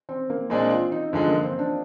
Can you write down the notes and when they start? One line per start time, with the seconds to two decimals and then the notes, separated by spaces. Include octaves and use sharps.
0.09 C4
0.30 A#3
0.50 A#2 G#3 C4 D4
0.71 F4
0.92 D#4
1.12 G2 D3 F3 G#3
1.28 A#3
1.43 C4
1.59 D4